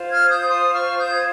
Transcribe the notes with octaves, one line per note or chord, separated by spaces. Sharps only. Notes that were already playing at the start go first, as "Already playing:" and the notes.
Already playing: F4 C5
F6 G#6
D#6 G6
C6 D#6
C#6 F6
D#6 G6
G#6